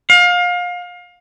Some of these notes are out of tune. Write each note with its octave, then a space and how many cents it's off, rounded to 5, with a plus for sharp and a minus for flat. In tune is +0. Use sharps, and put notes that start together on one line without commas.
F5 +30